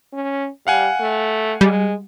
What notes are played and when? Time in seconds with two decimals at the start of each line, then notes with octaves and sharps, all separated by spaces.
0.13 C#4
0.67 G3 F5 F#5 G#5
1.00 A3
1.61 G3 G#3